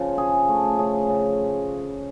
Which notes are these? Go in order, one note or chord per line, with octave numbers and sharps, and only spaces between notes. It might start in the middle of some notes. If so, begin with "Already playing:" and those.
Already playing: C#3 F3 F4
C#4 G#4
A3
C#4 G#4
C#3